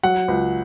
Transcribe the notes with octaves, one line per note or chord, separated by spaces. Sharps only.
F#3 F#5
C#2